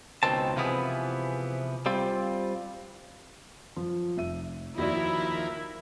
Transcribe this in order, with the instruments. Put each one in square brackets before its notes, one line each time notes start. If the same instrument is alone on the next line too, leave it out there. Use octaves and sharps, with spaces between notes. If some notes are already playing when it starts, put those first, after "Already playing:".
[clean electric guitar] C#2 B2 D#3 C4 A5
C3 E3 F3 B3 E4 G#4
G3 C4 F4
[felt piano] F3
F1 E5 D#7
[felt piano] D#2 F#4 D5 [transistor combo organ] D#3 F3 A#4 [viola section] E4